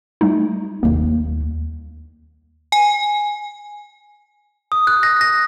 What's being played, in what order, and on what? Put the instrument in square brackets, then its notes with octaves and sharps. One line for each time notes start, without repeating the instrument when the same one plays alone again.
[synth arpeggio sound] G3 A3 D#4
[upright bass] D#2 G3 [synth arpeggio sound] A#3
[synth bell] G#5
[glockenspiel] D#6
F#6
A#6
A#6